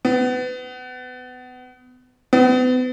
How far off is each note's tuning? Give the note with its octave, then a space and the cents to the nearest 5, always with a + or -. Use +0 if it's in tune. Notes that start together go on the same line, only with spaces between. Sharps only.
B3 +30
B3 +40